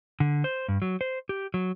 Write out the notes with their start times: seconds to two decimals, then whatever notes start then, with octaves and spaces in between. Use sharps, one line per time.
0.20 D3
0.44 C5
0.68 G2
0.82 F#3
1.01 C5
1.29 G4
1.54 F#3